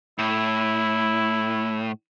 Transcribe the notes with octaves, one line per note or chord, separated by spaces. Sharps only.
A2 E4